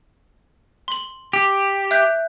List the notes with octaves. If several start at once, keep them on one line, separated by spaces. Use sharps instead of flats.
C6 F#7
G4
E5 F#6 G6